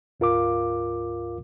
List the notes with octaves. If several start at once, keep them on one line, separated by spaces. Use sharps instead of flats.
D2 G#2 F4 A#4 F5 D6